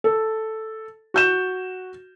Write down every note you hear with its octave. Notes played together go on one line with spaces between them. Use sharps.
A4
F#4 G6 E7